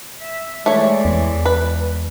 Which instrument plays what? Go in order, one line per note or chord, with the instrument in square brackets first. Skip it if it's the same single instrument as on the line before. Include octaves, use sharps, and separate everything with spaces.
[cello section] E5
[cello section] E3 G#3 D5 [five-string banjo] A3 C#5
[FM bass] E2
[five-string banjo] B4